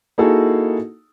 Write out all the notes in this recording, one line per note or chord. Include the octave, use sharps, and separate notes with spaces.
A#3 D#4 E4 F#4 G#4 A4